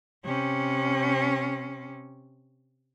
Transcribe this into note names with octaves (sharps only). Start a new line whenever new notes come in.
C3 C#4